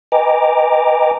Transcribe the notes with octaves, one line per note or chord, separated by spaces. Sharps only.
B4 D#5 G5 G#5 A#5 D6